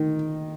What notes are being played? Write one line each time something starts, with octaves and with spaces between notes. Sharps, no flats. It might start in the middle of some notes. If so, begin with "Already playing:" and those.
Already playing: D#3